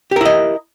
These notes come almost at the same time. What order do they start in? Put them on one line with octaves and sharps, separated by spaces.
G4 A#4 E4 D#5